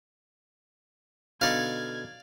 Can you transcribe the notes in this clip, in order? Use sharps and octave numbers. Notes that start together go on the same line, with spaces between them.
B2 D3 D#4 D5 F5 G#6